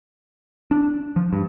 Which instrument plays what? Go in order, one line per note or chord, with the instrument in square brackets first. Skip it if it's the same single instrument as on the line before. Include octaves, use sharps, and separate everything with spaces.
[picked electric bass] D4
F3
G2